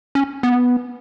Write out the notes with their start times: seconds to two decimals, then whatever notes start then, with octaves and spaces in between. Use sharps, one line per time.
0.15 C#4
0.43 B3